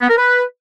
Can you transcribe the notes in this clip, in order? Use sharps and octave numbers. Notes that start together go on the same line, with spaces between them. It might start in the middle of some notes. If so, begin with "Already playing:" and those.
B3
A#4
B4